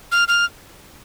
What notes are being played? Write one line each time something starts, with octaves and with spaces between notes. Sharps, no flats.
F6
F6